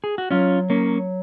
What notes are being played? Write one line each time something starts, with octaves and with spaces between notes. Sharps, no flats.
G#4
F#4
F#3 C#4 F4
A#3 C#4